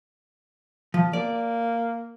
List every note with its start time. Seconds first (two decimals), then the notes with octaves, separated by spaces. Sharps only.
0.94 F3
1.13 A#3 D5